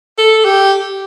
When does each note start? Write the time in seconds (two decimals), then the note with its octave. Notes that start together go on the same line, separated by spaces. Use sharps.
0.18 A4
0.45 G4